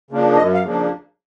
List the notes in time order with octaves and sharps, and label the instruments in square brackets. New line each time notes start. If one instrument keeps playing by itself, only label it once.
[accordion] C#3 F3 A#3 D4
F#2 D#5
F5
C#3 F3 A#3 D4